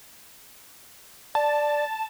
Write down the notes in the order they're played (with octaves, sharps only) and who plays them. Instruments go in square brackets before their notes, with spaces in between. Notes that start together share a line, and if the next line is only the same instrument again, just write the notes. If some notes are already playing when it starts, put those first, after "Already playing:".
[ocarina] D5 [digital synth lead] A5